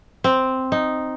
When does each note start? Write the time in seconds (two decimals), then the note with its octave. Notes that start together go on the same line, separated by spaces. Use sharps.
0.24 C4
0.72 D#4